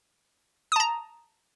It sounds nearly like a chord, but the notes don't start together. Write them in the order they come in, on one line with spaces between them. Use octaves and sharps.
D#6 A5 A#5